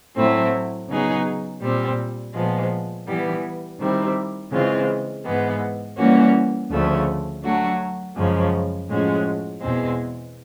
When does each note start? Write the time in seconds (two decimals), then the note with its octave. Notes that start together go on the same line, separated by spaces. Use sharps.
0.15 A2 F#3 A3 C4 E4
0.88 C#3 F#3 B3 D#4 G#4
1.61 A#2 G3 C4
2.34 A#2 F3 G#3 B3
3.06 E3 G3 B3
3.79 D#3 G3 C4 E4
4.52 C#3 E3 G#3 C4 F4
5.24 G#2 E3 G#3 B3
5.97 E3 G3 A#3 C#4 F#4
6.70 D2 C#3 F3 A3
7.43 F#3 A3 D4 F#4
8.15 F#2 C#3 F3 G#3
8.88 A2 F3 G#3 C#4 F#4
9.61 E2 B2 G#3 C4